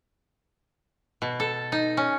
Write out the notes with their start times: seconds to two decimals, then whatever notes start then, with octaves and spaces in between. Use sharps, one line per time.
1.22 B2
1.40 A4
1.72 D#4
1.97 C#4